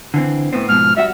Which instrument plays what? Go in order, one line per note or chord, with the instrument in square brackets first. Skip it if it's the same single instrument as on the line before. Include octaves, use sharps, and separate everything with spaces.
[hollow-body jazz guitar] D3 E3 C4
A2 B3 C4
[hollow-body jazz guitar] G#2 B2 F3 [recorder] F6
[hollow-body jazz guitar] G3 F#4 F#5 [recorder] E5